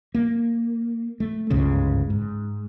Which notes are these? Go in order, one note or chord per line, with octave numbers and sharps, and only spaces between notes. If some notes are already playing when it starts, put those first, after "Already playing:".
A#3
A3
G1 C#2 G#2 C#3
G#2